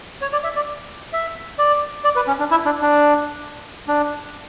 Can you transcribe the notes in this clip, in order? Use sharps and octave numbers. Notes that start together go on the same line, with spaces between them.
C#5
D5
E5
D5
E5
D5
D5
B4
C#4
D4
E4
D4
D4
D4